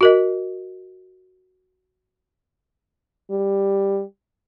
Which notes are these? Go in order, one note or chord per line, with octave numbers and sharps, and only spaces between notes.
F#4 A#4 D#5
G3